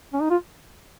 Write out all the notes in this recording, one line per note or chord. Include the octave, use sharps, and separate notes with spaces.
C#4
D#4
F4